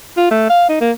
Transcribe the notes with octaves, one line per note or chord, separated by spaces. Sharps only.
F4
A3
F5
D#4
A#3